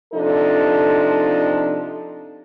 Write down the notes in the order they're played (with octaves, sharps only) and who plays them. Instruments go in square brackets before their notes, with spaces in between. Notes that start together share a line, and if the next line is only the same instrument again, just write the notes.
[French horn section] C3 F3 D4 D#4 A4